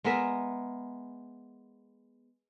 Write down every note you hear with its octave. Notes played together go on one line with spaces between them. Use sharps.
G#3 B3 A#4 E5